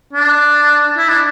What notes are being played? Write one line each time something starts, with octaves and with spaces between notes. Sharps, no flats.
D4
E4
D4